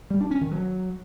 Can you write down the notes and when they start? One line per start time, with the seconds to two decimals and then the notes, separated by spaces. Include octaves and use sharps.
0.10 G3
0.21 D4
0.31 C#4
0.41 D#3
0.51 F#3